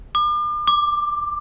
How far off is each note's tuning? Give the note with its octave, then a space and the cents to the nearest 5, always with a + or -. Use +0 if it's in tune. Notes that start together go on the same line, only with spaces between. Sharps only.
D6 +40
D6 +10